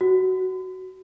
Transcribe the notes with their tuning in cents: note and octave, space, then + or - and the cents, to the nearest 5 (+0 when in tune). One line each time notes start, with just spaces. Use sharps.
F#4 +15